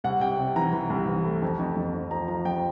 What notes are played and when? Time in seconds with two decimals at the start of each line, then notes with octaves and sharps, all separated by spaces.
0.04 C2 F#5
0.21 C3 G5
0.39 C3
0.56 E3 A#5
0.73 E3
0.90 C2
1.07 E3
1.24 A3
1.42 F2
1.59 F2
1.76 F2
1.94 F2
2.11 F3 A#5
2.28 F3 A#5
2.45 F2 G5